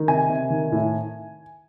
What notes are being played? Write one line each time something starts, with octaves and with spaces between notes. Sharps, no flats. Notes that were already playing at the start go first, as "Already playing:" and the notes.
Already playing: D#3
C3 G#5
C3
D#3
A2